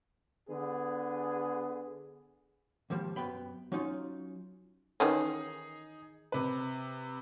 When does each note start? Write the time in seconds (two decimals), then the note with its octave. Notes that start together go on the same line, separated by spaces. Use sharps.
0.48 D3 B3 G#4
2.90 D#2 G#2 F3 G3
3.16 F#2 B3 G5 B5
3.72 F#3 C#4 D#4 F4
5.00 D#3 E3 C#4 D#4 G#4
6.32 C3 B4